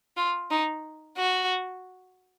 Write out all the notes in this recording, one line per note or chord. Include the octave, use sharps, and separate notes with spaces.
F4
D#4
F#4